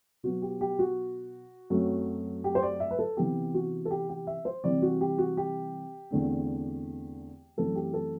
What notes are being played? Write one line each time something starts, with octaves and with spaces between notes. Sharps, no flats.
B2 F#3 B3 F#4
G4
G4
F#4
F#2 F#3 A3 C4
G4
C5
D5
E5
B4
A4
C3 E3 B3 G4
F#4
A4
G4
G4
E5
C5
C3 E3 G3 C4 D5
F#4
G4
F#4
G4
E2 D3 A3 C4
F#2 E3 A3 C4 A4
G4
A4